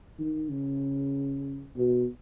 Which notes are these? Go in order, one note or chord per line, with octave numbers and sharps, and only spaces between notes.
D#3
C#3
B2